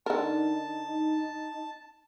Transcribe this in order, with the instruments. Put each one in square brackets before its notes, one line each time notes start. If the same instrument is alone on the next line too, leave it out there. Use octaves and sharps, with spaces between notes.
[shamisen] D3 A#4 [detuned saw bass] D#4 [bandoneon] A5